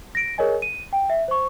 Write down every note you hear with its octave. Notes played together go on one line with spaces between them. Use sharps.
A#6 D7
G#4 A#4 C#5 D#5 G#5
D#7
G5
E5
C5 C#6